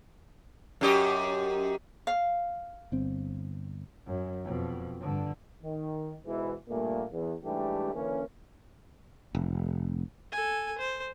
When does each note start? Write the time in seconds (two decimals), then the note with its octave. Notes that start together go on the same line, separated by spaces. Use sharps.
0.81 F#2 G4 D#5
2.07 F5
2.92 G1 C4
4.06 F#2
4.44 F2 B2
5.01 G2 D3
5.63 D#3
6.26 G#2 B2 E3
6.69 G2 A#2 A3 A#3
7.12 E2
7.44 G#2 E3 G3 A3 D4 G4
7.94 D3 E3 A#3 C#4
9.35 F1
10.32 A4 G#5
10.78 C5